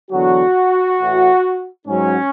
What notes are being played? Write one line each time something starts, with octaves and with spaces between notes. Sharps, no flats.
E2 D3 F#3 F#4
A2 E3
G#2 F#3 C#4